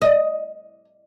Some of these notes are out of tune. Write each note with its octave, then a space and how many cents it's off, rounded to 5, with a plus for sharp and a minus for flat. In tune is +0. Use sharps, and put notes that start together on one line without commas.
D#5 +10